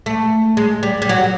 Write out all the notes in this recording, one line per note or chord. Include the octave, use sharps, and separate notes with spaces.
A3
G#3
G3
G3
F#3